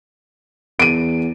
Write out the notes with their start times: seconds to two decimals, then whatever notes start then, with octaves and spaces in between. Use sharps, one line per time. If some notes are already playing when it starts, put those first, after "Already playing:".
0.79 E2 D7 D#7